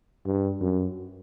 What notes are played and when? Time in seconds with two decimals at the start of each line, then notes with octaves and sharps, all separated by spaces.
0.26 G2
0.61 F#2